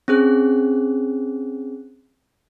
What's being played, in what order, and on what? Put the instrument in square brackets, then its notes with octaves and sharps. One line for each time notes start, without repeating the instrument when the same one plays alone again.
[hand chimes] C4 C#4 G#4 F#6